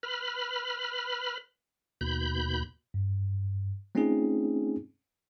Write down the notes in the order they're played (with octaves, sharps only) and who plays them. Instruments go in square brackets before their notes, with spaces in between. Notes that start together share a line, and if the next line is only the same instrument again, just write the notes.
[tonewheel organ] B4 B5 F6
D#2 B2 B5 G6
[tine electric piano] G2
A3 C4 C#4 D#4 F4 G#4